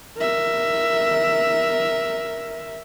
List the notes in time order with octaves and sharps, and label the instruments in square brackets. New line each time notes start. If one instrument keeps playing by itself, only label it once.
[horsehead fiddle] A#4 E5